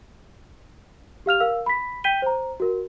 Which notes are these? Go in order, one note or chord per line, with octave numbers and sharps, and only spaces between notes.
G4 F5 F6 F7
A#4 F5 E6
B5 B6
G5 G6 B6 D#7 G7
C5 A#5
F#4 A#4